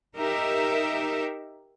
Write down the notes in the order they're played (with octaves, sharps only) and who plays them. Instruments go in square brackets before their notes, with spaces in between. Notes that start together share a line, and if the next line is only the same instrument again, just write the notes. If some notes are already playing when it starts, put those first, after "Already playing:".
[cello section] D#4 G4 A#4 E5